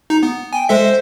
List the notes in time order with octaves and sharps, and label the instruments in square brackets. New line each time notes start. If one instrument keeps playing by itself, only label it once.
[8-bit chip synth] D#4
B3
[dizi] G5 [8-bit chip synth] G#5
[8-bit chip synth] G#3 A4 E5 [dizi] C5